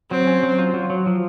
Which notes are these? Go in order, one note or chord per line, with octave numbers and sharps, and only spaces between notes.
F#3 C4
C#4
F#3
F4
F#3
F#3
F3